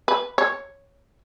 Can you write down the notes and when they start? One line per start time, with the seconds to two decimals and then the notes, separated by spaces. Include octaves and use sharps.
0.08 B4
0.38 C#5